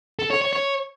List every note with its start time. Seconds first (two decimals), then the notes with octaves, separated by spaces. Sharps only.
0.19 A4
0.30 C#5
0.42 C#5
0.53 C#5